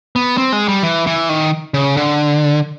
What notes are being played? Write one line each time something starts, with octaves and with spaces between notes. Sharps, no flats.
B3
C4
G#3
G3
E3
E3
D#3
C#3
D3